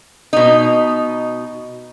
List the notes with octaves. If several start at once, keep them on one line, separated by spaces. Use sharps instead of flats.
B2 D#4